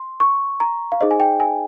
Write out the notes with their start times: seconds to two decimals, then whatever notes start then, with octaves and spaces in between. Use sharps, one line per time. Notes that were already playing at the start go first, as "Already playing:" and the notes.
Already playing: C6
0.20 C#6
0.60 A#5
0.92 F5
1.01 D#4 G#4 C5 D#5
1.11 G#5
1.20 G5
1.40 G#5